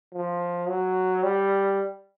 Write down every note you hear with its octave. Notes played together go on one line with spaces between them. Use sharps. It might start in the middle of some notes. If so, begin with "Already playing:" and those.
F3
F#3
G3